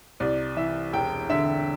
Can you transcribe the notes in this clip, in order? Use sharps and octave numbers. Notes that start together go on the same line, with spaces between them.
C2 D5
E3 E5
E1 G5
D3 E5